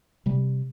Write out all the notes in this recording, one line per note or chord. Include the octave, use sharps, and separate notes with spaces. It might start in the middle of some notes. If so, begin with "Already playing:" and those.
C3 G3